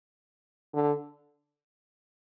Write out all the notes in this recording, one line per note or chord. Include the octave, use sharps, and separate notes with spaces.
D3